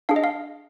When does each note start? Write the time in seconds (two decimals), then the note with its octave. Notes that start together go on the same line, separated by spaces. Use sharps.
0.09 D4 G#4 F5
0.16 D#5
0.24 F5